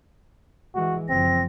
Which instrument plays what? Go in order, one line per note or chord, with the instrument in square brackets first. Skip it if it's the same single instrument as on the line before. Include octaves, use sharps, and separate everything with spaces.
[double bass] E3 G#3 [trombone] F#4
[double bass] F#1 F3 [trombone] C4 [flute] A#6